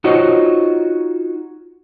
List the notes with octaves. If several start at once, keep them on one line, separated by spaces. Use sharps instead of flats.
D#4 F4 F#4 C5 C#5 D#5